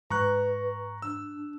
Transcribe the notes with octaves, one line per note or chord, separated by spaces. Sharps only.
G#2 B4 A#5 C#6 F#6
D4 E6